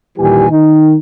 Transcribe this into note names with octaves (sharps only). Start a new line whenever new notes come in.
D#2 A#2 E3 G3 G4 G#5
D#3 D#4